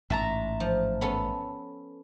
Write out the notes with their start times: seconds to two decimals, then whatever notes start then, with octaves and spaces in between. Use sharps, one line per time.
0.10 A1 G#2 E5 A5 A#5
0.60 F3
1.01 B3 C#4 A4